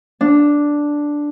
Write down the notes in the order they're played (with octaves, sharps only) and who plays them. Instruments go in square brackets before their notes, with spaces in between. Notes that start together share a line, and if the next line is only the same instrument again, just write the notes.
[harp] D4